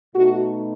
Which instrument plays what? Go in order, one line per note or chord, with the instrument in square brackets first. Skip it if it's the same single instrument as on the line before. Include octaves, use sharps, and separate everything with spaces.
[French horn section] B2 A3 D#4 F#4